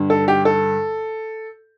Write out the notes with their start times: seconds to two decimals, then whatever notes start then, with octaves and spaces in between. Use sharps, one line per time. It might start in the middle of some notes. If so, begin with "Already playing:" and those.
Already playing: G2 D3
0.10 A4
0.28 G4
0.45 A4